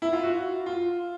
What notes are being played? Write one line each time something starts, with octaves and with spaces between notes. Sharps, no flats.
E4
F4
F#4
F4